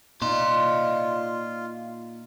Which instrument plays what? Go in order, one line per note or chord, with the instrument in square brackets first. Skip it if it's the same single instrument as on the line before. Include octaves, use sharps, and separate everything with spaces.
[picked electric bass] A#2 [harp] D#4 [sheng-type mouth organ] F4 [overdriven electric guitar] D5 C6